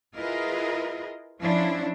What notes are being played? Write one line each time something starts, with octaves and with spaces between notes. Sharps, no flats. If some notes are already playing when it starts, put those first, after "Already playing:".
E4 F4 G#4 A#4 B4 D#5
F3 C#4 D4 E4